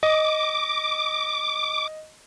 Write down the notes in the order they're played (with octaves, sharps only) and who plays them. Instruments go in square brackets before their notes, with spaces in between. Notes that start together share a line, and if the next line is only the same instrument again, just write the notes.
[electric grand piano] D#5 [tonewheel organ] D6